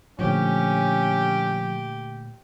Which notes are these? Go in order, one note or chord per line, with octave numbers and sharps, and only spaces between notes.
A#2 D3 F3 A3 C#4 G4